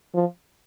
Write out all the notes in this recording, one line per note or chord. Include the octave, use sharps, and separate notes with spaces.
F3